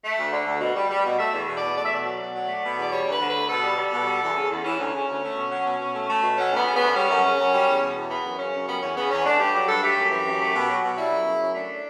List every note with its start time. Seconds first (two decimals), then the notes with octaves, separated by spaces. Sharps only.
0.04 A3
0.17 D2
0.32 D3
0.47 D2
0.61 B2
0.75 G3
0.90 G3
1.05 B2
1.19 A3 E5
1.33 E2
1.47 B2
1.57 E2 D5
1.76 A3 D5
1.85 E5
1.91 B2 D5
2.05 F#3
2.20 B2
2.34 F#3
2.48 A3
2.63 B2
2.77 E2 D5
2.92 G3 C#5
3.06 D2
3.11 B4
3.20 D3
3.29 B4
3.34 D2
3.48 B2 A4
3.63 G3
3.78 G3
3.92 B2
4.07 G3
4.22 E2
4.35 C#3
4.50 E2
4.64 E3 C#4
4.78 D2
4.92 C#3
5.08 D2
5.22 A3
5.36 B2
5.50 F#3
5.65 B2
5.79 B2
5.93 A3
6.09 A3
6.23 B2
6.37 F#3 C#4
6.51 D2 B3
6.65 C#3
6.76 D2 B3
6.95 G3 C#4
7.09 F#2
7.24 C#3
7.38 F#2
7.52 G3
7.67 E2
7.81 B2
7.95 E2
8.10 E3 B3
8.24 F#2
8.38 C#3 C#4
8.53 F#2
8.67 G3 B3
8.81 E2 C#4
8.96 C#3 B3
9.10 E2 C#4
9.25 A3 D4
9.39 G2 G4
9.53 F#3 G4
9.67 G2 A4
9.83 A3 G4
9.97 F#2
10.11 E3
10.26 F#2
10.40 A3
10.55 B2
10.69 F#3
10.83 B2
10.97 G3 E4
11.12 F#2
11.27 C#3
11.41 F#2
11.55 A3 D4